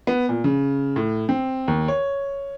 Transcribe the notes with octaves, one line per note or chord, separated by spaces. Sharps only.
B3
A#2
C#3
A2
C4
D#2
C#5